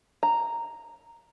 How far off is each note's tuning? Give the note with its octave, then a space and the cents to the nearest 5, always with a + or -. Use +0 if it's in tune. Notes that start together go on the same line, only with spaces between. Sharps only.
A#5 -5